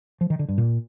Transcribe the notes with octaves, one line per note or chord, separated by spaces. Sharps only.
F3
D#3
D3
G2
A#2